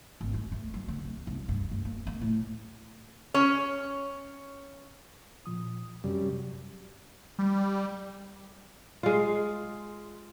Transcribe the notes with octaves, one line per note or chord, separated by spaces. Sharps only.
G#1
G#3
A3
F#3
D3
C3
C2
G2
F#2
A#3
A#3
A2
C#4 C#5
A#2 F3 D#6
F#2 C3 G3
G3
G#3 F4